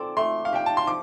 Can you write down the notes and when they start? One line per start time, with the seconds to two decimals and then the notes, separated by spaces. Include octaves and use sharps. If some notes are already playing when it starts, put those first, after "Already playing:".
Already playing: C4 A4 D5 D6
0.17 A3 C6
0.45 F5
0.53 D4 G4 G5
0.66 A5
0.77 C6
0.87 F3 D6